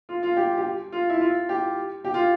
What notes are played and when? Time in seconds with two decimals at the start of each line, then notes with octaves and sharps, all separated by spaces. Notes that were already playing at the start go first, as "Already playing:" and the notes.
0.09 F4
0.23 F4
0.37 G4
0.57 G4
0.92 F4
1.10 E4
1.21 F4
1.49 G4
2.04 G4
2.14 F4